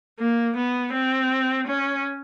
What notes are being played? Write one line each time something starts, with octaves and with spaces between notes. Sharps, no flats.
A#3
B3
C4
C#4